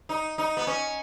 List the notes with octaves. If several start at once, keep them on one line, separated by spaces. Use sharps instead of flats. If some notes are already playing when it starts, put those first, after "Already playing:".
D#4
D#4
B3
C#4